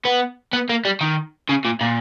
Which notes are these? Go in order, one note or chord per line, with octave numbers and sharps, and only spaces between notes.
B3
B3
A#3
G3
D#3
C#3
A#2
A#2